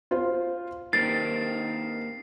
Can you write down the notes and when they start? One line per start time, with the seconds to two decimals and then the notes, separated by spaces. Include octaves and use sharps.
0.11 F4 C5 F5
0.93 D#3 A#3 C4 G4 A6 C7